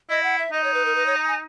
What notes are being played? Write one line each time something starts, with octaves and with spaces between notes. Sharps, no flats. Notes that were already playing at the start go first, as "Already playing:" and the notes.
E4 D#5
F#5
E5
D#4 D#5
C#5
B4
A#4
B4
C#5
A#5
G#5